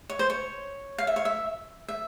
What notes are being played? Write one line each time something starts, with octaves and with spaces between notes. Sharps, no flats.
C#5
C5
C#5
F5
E5
C#5
E5
E5